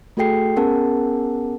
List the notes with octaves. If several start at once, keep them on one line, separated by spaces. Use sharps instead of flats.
A3 F#4 G#4 A4 G5 C7
B3 C#4 G#4 A#4 F#5 A5